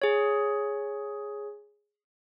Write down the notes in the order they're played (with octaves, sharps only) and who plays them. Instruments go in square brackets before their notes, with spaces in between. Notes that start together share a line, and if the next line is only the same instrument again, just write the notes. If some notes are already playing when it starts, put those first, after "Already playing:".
[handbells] G#4 C#5